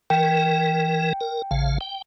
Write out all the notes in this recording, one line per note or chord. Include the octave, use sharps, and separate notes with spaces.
E3 A#4 G5
A#4
A1 C#3 F5
G5